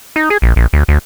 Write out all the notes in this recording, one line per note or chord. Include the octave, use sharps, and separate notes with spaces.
D#4
G#4
A#1
A#1
D2
D2